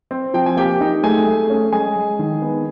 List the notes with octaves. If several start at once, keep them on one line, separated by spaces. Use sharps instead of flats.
C4
F3 G5
G#5
A#3 G4 G5
D#4
A3 G#4 G#5
A3
C#4
G#3 G#4 G#5
G#3
D#3
B3